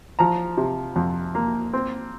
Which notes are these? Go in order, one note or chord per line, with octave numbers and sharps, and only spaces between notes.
F3 A#5
C3
F2
A#3
C4